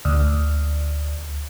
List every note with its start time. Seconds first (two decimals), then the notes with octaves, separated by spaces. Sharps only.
0.05 D2